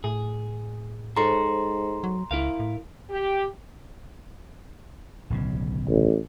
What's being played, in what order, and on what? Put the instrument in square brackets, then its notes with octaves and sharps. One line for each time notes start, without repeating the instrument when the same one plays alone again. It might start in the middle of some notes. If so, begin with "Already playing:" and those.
[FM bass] A2 [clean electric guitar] G#4
[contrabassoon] G#2 [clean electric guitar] A4 C5 C#5 [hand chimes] A#5 C6
[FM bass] F#3
[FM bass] C#2 [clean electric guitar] E4 A#4 F5
[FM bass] A2
[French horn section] G4
[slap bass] D1 B1 C#3
[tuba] A1